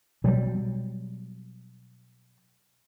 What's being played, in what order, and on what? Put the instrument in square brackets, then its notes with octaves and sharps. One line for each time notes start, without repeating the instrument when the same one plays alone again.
[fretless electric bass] B2 F#3 G3